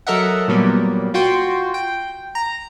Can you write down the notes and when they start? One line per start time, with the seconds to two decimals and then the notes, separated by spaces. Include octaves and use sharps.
0.07 F#3 A4 A#4 D#5 E5 F#5
0.48 A#2 F#3 G3 A#3 B3
1.14 F4 F#4 G5 C6
1.74 G5
2.35 A#5